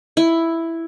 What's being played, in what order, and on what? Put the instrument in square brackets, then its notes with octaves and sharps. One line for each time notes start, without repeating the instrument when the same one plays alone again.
[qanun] E4